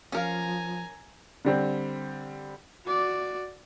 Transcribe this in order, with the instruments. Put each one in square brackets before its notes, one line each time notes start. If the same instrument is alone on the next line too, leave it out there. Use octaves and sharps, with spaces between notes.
[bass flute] F3 [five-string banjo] C#4 A#4 F5 [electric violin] G#5 A#5
[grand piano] D3 G3 C4
[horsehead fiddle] F#4 D5